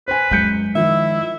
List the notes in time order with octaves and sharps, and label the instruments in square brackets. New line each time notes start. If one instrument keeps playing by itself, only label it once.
[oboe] B4 [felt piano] C5 G#5
[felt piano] F#2 G6 C#7 [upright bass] G#3
[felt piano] D#3 F3 [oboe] E4 [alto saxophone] E5